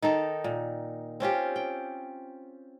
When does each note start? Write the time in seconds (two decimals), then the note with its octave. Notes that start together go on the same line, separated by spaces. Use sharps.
0.02 D#3 D#4 A4
0.44 A#2
1.20 C4 C#4 F4 G4
1.56 G5